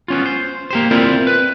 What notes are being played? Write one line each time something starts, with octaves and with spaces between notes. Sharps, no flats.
B3 C#4 F4
C5
A#3 G4 C5
C4 E4 F4 A#4 C5 D5
B4